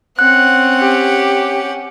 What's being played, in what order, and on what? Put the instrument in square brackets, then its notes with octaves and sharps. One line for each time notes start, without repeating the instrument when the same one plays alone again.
[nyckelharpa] C4 [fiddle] C#4 F#5 [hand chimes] F#6
[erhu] G4